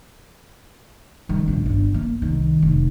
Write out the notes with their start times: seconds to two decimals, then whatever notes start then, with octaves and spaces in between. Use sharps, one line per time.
1.29 D#3 G3
1.48 A#1 D#2
1.66 G1 D3
1.94 A#3
2.22 C2 D#3
2.62 F1